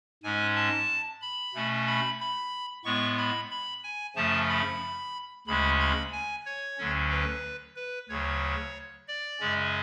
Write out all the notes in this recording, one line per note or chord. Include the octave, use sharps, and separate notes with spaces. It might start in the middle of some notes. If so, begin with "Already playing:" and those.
G#2 G#3 C#4 G#5
A5
B5
B2 A3 C#4
B5
B5
A2 G#3 B3 C#6
B5
B5
G#5
F#2 C#3 F3 A3 C#4 A5
B5
D2 C#3 G#3 C#4 B5
B5
G#5
C#5
D2 D3 F#3 C#4
B4
B4
D2 C#3 F#3 C#5
D5
F#2 C#3 G#3 C#4